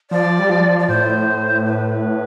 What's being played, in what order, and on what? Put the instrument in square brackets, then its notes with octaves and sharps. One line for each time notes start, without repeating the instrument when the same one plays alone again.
[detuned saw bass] F3 [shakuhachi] D5
[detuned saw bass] G3
F3
[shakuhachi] D5
[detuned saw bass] A2 [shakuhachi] C5
[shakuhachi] B4